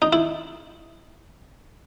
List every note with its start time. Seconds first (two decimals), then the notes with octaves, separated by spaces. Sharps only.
0.02 D#4
0.13 E4